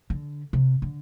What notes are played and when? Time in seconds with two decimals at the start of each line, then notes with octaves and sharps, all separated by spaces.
0.10 D3
0.53 C3
0.82 D3